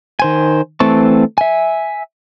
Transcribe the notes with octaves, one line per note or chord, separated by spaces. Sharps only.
D#3 C5 G#5
E3 A3 C4 A5 C#6
E5 G#5